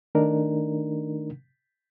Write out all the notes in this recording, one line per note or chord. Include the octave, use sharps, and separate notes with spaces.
D#3 A3 D4 D#4 A#4